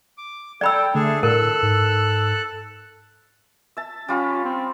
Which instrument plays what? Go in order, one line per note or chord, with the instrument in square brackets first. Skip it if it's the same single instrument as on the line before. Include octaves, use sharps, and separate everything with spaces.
[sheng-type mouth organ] D6
[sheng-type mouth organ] A4 [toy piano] D5 B5 E6 [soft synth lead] G5
[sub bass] D3 [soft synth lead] A3 [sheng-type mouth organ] D4 G#4 A4
[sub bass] A2 [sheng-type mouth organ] A4 F#6 [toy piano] A#4 [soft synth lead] E6
[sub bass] G#2
[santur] E5 A5
[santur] G3 F4 B5 [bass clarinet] C#4
[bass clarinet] C4